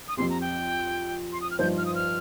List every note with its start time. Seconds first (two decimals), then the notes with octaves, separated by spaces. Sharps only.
0.08 D#6
0.17 F2 F3 C4 G4 C6
0.30 A#5
0.41 G5
1.32 C6
1.41 D#6
1.51 F6
1.59 G2 F3 D#4 C5 G6
1.78 F6
1.86 D#6
1.95 F6